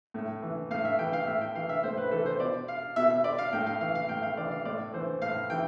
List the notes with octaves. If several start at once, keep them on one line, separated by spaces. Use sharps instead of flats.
A2
E3
A2 F5
E5
E3 G5
F5
A2 E5
G5
E3 F5
E5
A2 C5
B4
E3 A4
C5
B2 D5
F5
B2 E5
E5
D5
F5
A2 G5
F5
E3 F5
F5
A2 G5
F5
E3 D5
F5
A2 D5
E3 C5
A2 F5
E3 G5